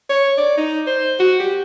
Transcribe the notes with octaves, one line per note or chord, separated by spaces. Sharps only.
C#5
D5
D#4
C5
F#4
G4